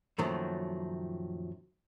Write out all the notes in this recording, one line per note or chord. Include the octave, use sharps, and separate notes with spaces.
F#2 A#2 D#3 F3 F#3 A3